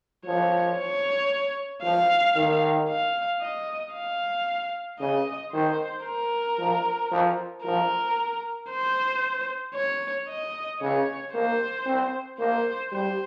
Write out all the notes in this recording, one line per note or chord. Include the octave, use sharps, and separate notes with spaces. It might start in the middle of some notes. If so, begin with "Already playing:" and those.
F3 C#5
C#5
F3 F5
D#3
F5
D#5
F5
C#3 D#5
D#3 C5
A#4
F3
F3
F3 A#4
C5
C#5
D#5
C#3 C#5
A#3 C5
C4
A#3 C5
G3 C5